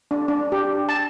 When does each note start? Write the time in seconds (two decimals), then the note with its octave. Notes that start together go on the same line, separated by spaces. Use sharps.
0.11 D4
0.28 D4
0.52 G4
0.89 A5